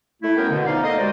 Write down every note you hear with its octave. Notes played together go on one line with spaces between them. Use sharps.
A3 E4
F#3 B3 C#4 A#4 G5
B2 D3
F3 A3 B3 D#4 D5 F5
A#3 A4 C5 D#5
G3 G#3 F#4 C5 D5